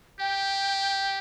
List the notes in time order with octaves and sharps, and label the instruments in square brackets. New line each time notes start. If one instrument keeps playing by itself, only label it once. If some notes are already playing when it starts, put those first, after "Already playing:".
[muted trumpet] G4 [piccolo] G5